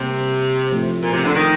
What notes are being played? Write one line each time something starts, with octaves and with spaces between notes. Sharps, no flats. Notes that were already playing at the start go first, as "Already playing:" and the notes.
Already playing: C3 G3 A#3
A2 F3 A3 C4
A#2
C3
D3
D#3